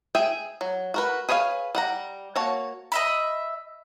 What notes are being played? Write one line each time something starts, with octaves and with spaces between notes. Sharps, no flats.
G#4 E5 G5
F#3
F#4 A#4 B4
G#4 B4 C#5 D#5 F5
G3 F#5 A#5
A#3 F#4 C#5 A5
D#5 E5 B5